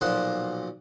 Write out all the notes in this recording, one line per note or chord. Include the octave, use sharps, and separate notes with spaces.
B1 A#2 F3 F#5 C6 D#6